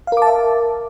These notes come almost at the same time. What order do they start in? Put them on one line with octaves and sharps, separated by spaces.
F5 A#4 D6 A5 E5